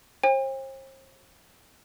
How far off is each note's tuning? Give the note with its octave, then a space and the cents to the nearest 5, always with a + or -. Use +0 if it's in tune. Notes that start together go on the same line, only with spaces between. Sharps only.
C5 +40 G5 +45